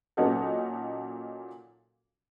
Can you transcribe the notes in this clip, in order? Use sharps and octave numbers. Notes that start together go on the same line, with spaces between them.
A#2 F#3 C#4 D#4 F#4 A4